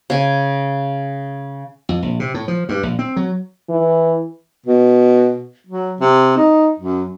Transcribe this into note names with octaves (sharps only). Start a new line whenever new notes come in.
C#3 G#5
F2
A#1
C3
A2
F3
G2
A#1
C4
F#3
E3
B2
F#3
C3
D#4
F#2